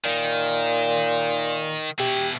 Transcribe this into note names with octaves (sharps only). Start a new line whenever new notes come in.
A#2 D#3
B2 E4 G4